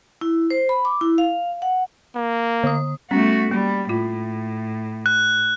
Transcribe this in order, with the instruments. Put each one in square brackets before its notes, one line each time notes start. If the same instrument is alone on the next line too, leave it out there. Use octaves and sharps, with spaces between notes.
[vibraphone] E4
C5
B5
D6
E4
F5
F#5
[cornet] A#3
[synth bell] D3 D#6
[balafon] G3 B3 C#4 [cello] A3 F#4
[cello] G3 [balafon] A#3
[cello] A2 [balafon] F4
[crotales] F#6